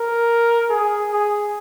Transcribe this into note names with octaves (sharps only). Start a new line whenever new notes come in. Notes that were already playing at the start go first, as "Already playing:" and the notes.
Already playing: A#4
G#4
G#4